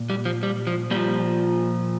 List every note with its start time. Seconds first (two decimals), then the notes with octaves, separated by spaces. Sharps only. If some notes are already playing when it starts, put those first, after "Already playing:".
Already playing: A#2
0.10 G3
0.25 F3
0.43 G3
0.67 F3
0.91 A#2 F3 G3